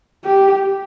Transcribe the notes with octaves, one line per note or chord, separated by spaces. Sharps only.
G4